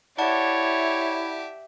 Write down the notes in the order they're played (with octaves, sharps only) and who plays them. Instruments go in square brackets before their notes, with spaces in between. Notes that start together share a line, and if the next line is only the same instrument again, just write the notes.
[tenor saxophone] E4 [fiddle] G4 E5 [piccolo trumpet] C#5 [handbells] D5 F#5 A5